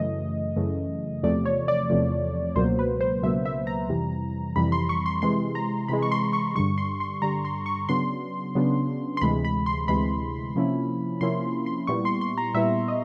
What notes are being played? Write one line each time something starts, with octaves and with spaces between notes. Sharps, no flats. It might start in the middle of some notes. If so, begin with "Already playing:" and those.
Already playing: F#2 C#3 E3 A3 D#5
F#2 C#3 E3 A3
E2 C3 F3 A3 D5
C#5
D5
E2 C3 F3 A3
C#2 B2 F#3 A#3 C5
B4
C5
C#2 B2 F#3 A#3 E5
E5
A#5
F2 C3 E3 G3
F2 C3 E3 G3 B5
C6
C#6
C6
C3 E3 G#3 C6
A#5
C3 E3 G#3 B5
C#6
C6
C#6
G2 D3 G3 C#6
C6
C6
G2 D3 G3 A#5
C6
C#6
C#3 F#3 B3 D4 C6
C#3 F#3 B3 D4
C6
D2 C3 E3 G#3 B5
B5
C6
D2 C3 E3 G#3 B5
C3 F3 A#3 C#4 E4
C3 F3 A#3 C#4 E4 C6
C6
A#2 G3 B3 E4 C#6
C6
C6
A#5
A#2 G3 B3 E4 E5
D#5